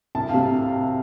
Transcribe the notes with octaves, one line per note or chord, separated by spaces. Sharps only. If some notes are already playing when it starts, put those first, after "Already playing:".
C2 A5
F5
C3